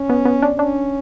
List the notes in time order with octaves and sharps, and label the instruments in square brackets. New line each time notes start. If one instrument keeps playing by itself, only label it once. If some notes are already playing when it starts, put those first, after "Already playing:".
Already playing: [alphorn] C#4
[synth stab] B3
B3
D4
[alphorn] C#4 [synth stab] D4